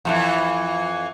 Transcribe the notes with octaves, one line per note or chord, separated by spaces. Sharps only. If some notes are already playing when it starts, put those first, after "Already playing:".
F2 C3 E3